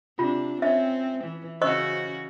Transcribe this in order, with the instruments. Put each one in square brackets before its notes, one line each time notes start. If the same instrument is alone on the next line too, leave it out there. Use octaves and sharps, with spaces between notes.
[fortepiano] C3 [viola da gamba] D4 [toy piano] F4
[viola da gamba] C4 [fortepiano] C#4 [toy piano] E5
[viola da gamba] E3
[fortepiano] C#3 E6 [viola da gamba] C#4 F#4 [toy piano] C5 D#5 C#6